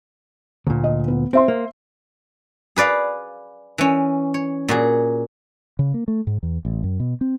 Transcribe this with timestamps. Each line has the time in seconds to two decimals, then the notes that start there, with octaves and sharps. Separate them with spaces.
0.67 D2 A#2
0.84 D#5
1.08 B3
1.33 C4 C5 E5 C6
1.48 A#3
2.76 G#4 B4 D5 F5
3.78 E3 C#4
4.34 C#5
4.68 A#2 F#4 G#4
5.79 C#3
5.94 A#3
6.08 A3
6.27 G#2
6.43 E2
6.65 A1
6.83 F#2
7.00 B2
7.21 C4